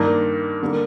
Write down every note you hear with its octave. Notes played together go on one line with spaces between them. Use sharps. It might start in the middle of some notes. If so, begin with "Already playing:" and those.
Already playing: G2 D#3 A#3 D4
D3 G3 A#3